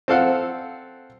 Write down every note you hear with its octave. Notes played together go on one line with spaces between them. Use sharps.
C4 A4 F5 F#5